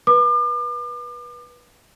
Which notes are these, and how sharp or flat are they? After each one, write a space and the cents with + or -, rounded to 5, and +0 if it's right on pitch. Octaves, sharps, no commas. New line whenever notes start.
B4 -25 D6 +40